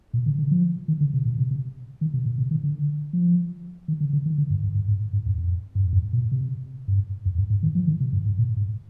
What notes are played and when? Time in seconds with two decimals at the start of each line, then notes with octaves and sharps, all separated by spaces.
0.13 A#2
0.26 D3
0.38 D3
0.51 F3
0.88 D#3
1.01 D3
1.13 C3
1.25 A#2
1.39 C3
1.51 C3
2.01 D#3
2.14 C3
2.26 A#2
2.38 C3
2.51 D#3
2.63 D3
3.13 F3
3.88 D#3
4.00 D3
4.13 D3
4.26 D#3
4.38 D3
4.50 G2
4.63 G2
4.75 G2
4.88 G#2
5.13 G#2
5.26 F2
5.38 F2
5.75 G2
5.84 F2
5.93 G2
6.13 A#2
6.32 C3
6.88 G2
7.25 F2
7.38 G2
7.50 G#2
7.63 D#3
7.75 F3
7.87 D#3
8.00 C3
8.13 G2
8.26 G#2
8.38 A#2
8.56 G#2